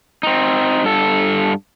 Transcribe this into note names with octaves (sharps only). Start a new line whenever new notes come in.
C4 D#4
G2 A4